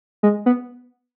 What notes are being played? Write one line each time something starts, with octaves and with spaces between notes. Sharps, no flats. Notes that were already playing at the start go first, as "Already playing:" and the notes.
G#3
B3